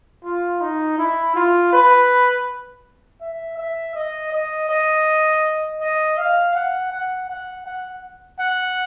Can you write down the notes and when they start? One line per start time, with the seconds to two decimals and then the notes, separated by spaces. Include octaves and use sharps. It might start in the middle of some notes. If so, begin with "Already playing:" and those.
0.24 F4
0.61 D#4
0.98 E4
1.36 F4
1.73 B4
3.21 E5
3.58 E5
3.95 D#5
4.32 D#5
4.69 D#5
5.81 D#5
6.18 F5
6.55 F#5
6.92 F#5
7.29 F#5
7.66 F#5
8.40 F#5